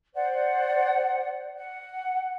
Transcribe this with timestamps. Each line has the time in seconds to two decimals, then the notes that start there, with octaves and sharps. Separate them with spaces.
0.14 C5 D5 F#5
1.56 F#5